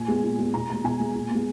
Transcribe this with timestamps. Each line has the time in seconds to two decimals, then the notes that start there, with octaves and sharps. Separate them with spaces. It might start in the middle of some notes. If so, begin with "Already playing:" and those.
Already playing: A#2 G#5
0.08 G#3 B3
0.23 A#2
0.39 G#3 B3
0.54 B2 A#5
0.69 G#3 B3 A#5
0.84 B2 G#5
1.00 G#3 B3
1.15 A#2
1.30 G#3 B3